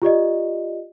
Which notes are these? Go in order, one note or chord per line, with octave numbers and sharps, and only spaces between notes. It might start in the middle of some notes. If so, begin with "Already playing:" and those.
F4 G4 D5 D#5